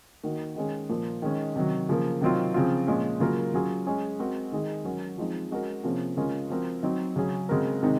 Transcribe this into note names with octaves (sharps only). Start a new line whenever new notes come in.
D#3 A#3 D#4 F#4
D#3 G#3 C#4 G#4
A#2 F3 A#3
D#3 G#3 C#4
C3 D#3 F#3
C#3 F3 A#3
C3 D#3 F#3 C4 F4
C#3 F3 C4 F4
A#2 F3 G#3 C#4
C#3 F#3 A#3 F4 A#4
F#3 C#4 F4 G#4
G#3 C#4 G#4
G#3 C4 F#4 A#4
D#3 G#3 D#4 G#4
F#3 C#4 F#4 A#4
F3 G#3 C4 D#4
G#3 C#4 F#4 A#4
C3 F3 A#3 C#4 G#4
C#3 G#3 C#4 F4 A#4
F3 C4 F#4 A#4
F#3 C4 D#4
C#3 F#3 C#4 G#4
C#3 G#3 C4 F#4 A#4
C3 D#3 G#3 D#4